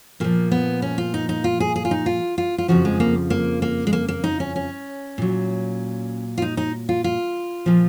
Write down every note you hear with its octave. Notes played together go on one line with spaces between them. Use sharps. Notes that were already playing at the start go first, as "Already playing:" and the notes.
A#2 F3 A#3
B3
C#4
F4
D#4
D#4
F4
G#4
G#4
F4
D#4
F4
F4
F4
F2 C#3 F3 F#4
G#3
A#3
A#3
A#3
G#3
A#3
A#3
D#4
C#4
C#4
A#2 F#3
F4
D#4
D#4
F4
F4
A#2 F3